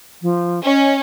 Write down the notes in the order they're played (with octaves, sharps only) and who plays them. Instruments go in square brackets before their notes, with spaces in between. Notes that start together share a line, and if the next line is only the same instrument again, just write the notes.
[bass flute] F3
[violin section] C#4 [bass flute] D#5